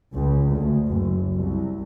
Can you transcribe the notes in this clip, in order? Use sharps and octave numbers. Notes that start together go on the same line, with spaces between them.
C#2
D2
F#1
C2